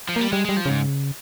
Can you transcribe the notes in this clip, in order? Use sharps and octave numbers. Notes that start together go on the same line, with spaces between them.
F3
G3 A#3
G3 G#3
G3 G#3
F3
G#2 C#3